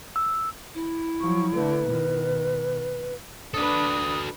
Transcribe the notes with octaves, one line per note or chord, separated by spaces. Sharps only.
E6
E4
F3 F#3 C#6
D3 A3 B4
B2 D#3
D4 F#4 A4 B4 D#6